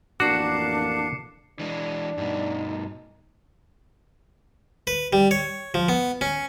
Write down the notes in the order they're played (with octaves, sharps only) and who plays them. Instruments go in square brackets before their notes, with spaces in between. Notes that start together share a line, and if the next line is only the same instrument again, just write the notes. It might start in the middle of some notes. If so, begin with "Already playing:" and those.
[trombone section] A1 F2 A#3 [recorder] D4 [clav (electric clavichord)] F#4 [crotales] D6 C7 C#7
[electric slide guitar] E3 G#3 [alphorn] D4
[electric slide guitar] G2 B2 [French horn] D#4
[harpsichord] B4
G3
C#5
F3
B3
C#4